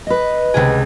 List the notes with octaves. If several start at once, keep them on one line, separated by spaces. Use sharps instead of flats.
B4 D#5
C#2 C3 G#4